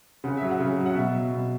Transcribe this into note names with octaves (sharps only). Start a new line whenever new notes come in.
C#3 F#5
F#3 E5
F#5
C#3
F#3
F#5
B2 E5
F#3
B2